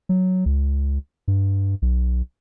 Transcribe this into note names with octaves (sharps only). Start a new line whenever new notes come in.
F#3
C#2
G2
B1